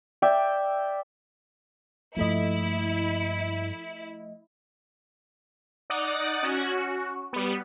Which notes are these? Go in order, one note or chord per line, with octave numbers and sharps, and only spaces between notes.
D5 E5 G5
G2 F3 A3 A#3 E4 D#5
D#4 D5 F#5 D6 D#6
C#4 F#4
G3 B3